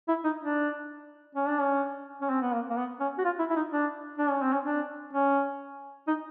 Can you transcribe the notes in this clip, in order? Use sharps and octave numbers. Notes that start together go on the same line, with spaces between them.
E4
D#4
D4
C#4
D4
C#4
C#4
C4
B3
A#3
A#3
B3
C#4
F#4
F4
E4
E4
D#4
D4
D4
C#4
C4
C#4
D4
C#4
D#4